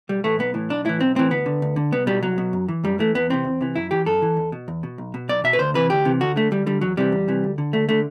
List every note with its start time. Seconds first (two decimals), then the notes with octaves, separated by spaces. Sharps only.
0.09 B1 G3
0.24 A2 E3 A3
0.39 B1 B3
0.54 A2 E3
0.70 B1 D4
0.85 A2 E3 E4
1.00 B1 C4
1.15 A2 E3 C4
1.30 D2 B3
1.46 D3
1.62 D2
1.76 D3
1.92 C2 B3
2.07 B2 G3
2.23 C2 F#3
2.38 B2
2.53 F#2
2.68 E3
2.84 F#2 G3
2.99 E3 A3
3.15 E2 B3
3.30 C3 E3 C4
3.45 E2
3.61 C3 E3
3.76 F#2 E4
3.91 E3 G4
4.06 F#2 A4
4.22 E3
4.37 E2
4.52 B2
4.68 E2
4.83 B2
4.98 B1
5.14 B2
5.29 B1 D5
5.44 B2 E5
5.53 B4
5.59 D2 C5
5.74 C3 E3 B4
5.90 D2 G4
6.05 C3 E3
6.21 D2 F#4
6.36 D3 A3
6.51 D2 G3
6.66 D3 G3
6.81 E2 F#3
6.97 C3 E3 G3
7.12 E2
7.28 C3 E3
7.44 D2
7.58 D3
7.73 D2 A3
7.89 D3 A3